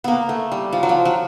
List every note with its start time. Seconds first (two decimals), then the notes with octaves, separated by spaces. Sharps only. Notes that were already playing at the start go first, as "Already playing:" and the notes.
0.04 A#3 B3
0.29 A3
0.52 G3
0.73 F3
0.83 F#3
0.89 F3
1.05 F#3